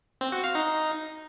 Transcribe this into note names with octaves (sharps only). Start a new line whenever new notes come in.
C4
F#4
F5
D#4